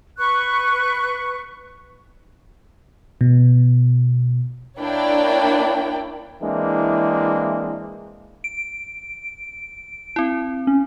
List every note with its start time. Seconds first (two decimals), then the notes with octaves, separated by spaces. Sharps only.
0.18 B4 C#6 F#6
3.21 B2
4.80 A#3 D4 E4 C#5 D5 G5
6.42 E3 G#3 A#3 C4 D4 E4
8.44 D7
10.16 C4 E4
10.67 C#4